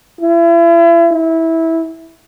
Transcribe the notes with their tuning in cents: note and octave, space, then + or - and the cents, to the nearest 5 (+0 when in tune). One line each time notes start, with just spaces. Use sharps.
E4 +40
E4 -15